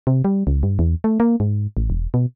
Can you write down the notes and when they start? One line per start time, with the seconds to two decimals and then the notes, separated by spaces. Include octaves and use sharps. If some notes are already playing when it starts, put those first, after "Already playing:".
0.07 C3
0.25 G3
0.47 C#2
0.63 G2
0.79 E2
1.04 A3
1.20 A#3
1.40 G#2
1.77 A1
1.90 E1
2.14 B2